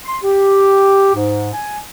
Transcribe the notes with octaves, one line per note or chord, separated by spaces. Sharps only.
C6
G4
G#2
G#5